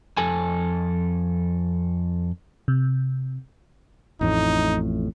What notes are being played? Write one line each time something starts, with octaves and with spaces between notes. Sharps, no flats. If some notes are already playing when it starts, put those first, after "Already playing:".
F2 A4 G#5
C3
A1 F2 A2 D#4